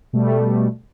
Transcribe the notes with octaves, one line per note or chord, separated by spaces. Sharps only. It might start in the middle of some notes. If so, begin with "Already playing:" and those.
B2 G3 A3